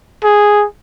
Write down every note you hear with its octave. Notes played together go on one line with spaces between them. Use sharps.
G#4